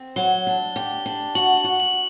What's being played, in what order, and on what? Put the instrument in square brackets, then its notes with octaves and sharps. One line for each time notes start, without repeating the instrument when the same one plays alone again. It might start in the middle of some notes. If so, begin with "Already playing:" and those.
Already playing: [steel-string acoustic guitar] C4
[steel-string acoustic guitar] F#3 [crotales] G7
[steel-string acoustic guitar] D4
G4
D4
[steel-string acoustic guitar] F#4 [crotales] F#7
[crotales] F#7
[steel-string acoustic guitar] F#4
[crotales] F#7